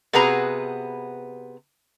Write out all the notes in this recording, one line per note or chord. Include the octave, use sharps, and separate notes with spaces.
C3 B3 F#4 G#4 B4 A#5